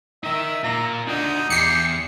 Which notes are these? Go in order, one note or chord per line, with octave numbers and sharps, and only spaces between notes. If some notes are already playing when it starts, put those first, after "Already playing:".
D#4 A#4 E5
A#3 F4 A#5
D4 D#4 F#4
E2 G4 C7 C#7